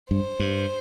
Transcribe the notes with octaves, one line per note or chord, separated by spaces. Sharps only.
G2 C5
G2